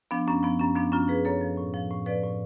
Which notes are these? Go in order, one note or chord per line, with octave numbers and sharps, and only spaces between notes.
F3 B3 D4
F#2 C#4
F3 B3
F#2 C#4
F3 B3 D4
F#2 C#4 F4
F3 G#4 B4
F#2 A4 C#5
F3
A2
F3
A2
F3 B4 D5
A2